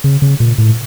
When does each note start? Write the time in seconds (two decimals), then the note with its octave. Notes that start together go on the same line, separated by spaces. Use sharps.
0.04 C#3
0.22 C#3
0.40 A#2
0.58 A2